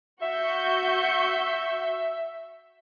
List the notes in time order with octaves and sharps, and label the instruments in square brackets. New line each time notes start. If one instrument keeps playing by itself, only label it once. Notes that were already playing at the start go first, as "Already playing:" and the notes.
[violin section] F#4 C#6 G6 [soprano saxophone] E5